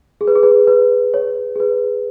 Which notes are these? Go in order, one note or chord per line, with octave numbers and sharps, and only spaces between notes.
G#4
B4
G#4
B4
G#4
B4
C#5
G#4
B4